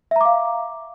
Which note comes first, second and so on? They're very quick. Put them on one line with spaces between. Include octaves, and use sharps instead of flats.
E5 A#5 D6 F5